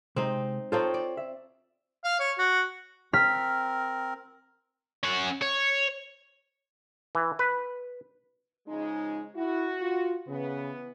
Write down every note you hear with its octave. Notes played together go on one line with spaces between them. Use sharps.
C3 G#3 C4 D#4
C4 D#4 F4 A4 C5 C#5
D5
E5
F5
C#5
F#4
C4 A#4 F6 B6
C#4 F#5
C#5
E3
B4
C#3 F3 G#3 D#4
E4 F#4
F4
C#3 E3 B3